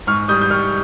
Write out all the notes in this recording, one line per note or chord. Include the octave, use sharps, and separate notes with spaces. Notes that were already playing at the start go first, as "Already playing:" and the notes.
G#2 C#6 F6
G3 D#6 G6
G6
G3 C#6 F6